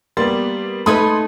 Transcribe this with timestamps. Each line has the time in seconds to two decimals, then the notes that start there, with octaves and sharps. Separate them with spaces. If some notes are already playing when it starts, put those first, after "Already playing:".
0.17 G3 A#3 B3 C6 A6
0.86 A3 D#4 B4 B5 C6 D#6 G#6